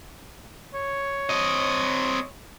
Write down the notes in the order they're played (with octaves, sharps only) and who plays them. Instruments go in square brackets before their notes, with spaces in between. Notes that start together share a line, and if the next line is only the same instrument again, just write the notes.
[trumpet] C#5
[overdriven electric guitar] C4 D#5